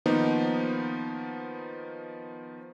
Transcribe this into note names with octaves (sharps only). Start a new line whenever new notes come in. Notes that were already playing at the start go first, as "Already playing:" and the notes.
D#3 F3 A#3 B3 D#4